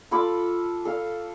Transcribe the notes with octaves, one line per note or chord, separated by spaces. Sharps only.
F4 A4 B5 D6
A4 F5